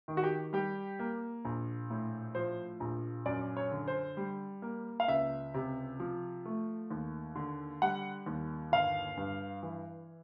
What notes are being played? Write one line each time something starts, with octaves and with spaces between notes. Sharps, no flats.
D#3
F#4
G4
G3 G4
A#3
A#1
A2
F3 C5
A#1
F#2 D5
C#5
D3
C5
G3
A#3
F5
C#2 E5
C3
F3
A3
D#2
D3
G3 F#5
D#2
G1 F5
G2
E3